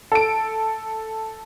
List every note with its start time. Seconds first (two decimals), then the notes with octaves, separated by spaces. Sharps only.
0.12 A4 D7